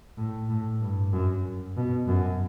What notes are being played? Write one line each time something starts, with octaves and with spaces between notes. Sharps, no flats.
A2
A2
G2
F#2
B2
F#2